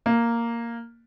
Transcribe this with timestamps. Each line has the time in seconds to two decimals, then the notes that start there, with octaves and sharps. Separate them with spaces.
0.06 A#3